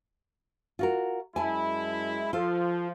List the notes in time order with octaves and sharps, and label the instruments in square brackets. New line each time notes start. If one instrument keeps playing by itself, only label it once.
[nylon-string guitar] F4 F#4 A#4
[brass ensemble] F#2 G#3 E4 [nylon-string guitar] G#5 A5
[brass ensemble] F3 [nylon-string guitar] F4 A4